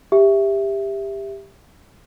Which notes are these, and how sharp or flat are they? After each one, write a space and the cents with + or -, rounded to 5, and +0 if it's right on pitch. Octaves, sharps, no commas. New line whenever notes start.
G4 +20 E5 +0